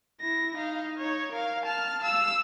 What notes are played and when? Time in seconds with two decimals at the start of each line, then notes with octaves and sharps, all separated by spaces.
0.21 E4 A#6
0.54 D#4 F5
0.98 D#4 C#5
1.32 A#4 F5
1.65 A5 F6
2.02 F5 E6